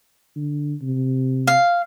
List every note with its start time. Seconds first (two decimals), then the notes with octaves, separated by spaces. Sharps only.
0.36 D3
0.82 C3
1.47 F5